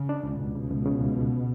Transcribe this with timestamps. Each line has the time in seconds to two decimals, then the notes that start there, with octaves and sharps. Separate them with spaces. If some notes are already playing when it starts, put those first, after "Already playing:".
Already playing: C#3
0.09 D4
0.23 C#2
0.39 C#2 B2
0.55 C#3
0.70 C#2
0.85 C#3
1.01 C#2
1.16 C#2